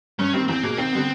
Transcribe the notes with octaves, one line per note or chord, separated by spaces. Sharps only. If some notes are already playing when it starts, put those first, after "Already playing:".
G2 C#4
D#3 G3 A#3 C4
E2 C4
B2 G#3 A#3
D#2 C4
D3 G3 B3